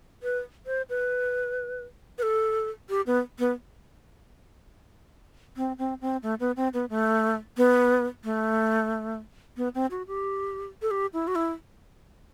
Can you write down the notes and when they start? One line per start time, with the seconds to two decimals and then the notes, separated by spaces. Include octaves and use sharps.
0.23 B4
0.67 C5
0.89 B4
2.18 B4
2.23 A4
2.90 G4
3.07 B3
3.39 B3
5.57 C4
5.78 C4
6.01 C4
6.23 A3
6.40 B3
6.57 C4
6.74 B3
6.90 A3
7.57 B3
8.24 A3
9.57 B3
9.75 C4
9.91 F#4
10.07 G4
10.82 A4
10.91 G4
11.13 E4
11.28 F#4
11.35 E4